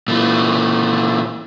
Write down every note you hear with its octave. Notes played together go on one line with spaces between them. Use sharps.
A#2 E3